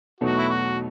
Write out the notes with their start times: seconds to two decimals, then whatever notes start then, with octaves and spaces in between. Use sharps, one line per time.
0.21 E2 B2 F#3 A3 D#4 F#4
0.38 E4
0.49 F#4